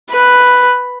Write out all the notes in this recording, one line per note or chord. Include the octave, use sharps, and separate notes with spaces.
B4